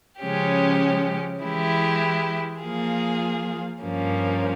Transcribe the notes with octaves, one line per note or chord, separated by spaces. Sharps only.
C#3 F3 G#3 C#4 G4
E3 G#3 E4 G4
F3 A#3 F4 G#4
G2 F3 A#3 C#4